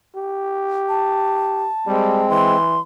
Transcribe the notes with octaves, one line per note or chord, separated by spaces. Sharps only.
G4
A5
G3 G#3 C4
E3 C6